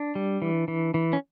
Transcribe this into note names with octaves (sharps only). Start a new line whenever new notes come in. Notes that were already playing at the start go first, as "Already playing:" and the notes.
Already playing: D4
G3
E3
E3
E3
C#4